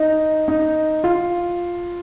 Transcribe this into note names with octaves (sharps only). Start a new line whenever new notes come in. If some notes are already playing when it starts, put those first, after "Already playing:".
Already playing: D#4
D#4
F4